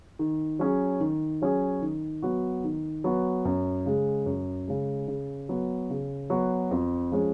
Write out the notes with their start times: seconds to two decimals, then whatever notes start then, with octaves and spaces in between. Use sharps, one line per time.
0.19 D#3
0.59 F#3 C#4 G#4
1.00 D#3
1.42 F#3 C#4 G#4
1.82 D#3
2.22 F#3 B3 F#4
2.64 D#3
3.04 F#3 B3 F#4
3.45 F#2
3.86 C#3 G#3
4.26 F#2
4.68 C#3 G#3
5.08 C#3
5.49 F#3 B3 F#4
5.90 C#3
6.30 F#3 B3 F#4
6.71 F2
7.12 F3 G#3 C#4